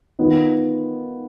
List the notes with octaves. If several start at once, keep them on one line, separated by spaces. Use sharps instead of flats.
D#3 B3 F4